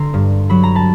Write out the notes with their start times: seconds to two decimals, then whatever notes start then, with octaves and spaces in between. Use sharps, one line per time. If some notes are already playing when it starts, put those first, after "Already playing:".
Already playing: D3 A#5 C6
0.14 G2
0.50 F#3 B5
0.63 A#5
0.75 A5 B5